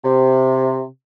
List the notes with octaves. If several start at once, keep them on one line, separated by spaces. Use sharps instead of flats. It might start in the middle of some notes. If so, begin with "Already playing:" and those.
C3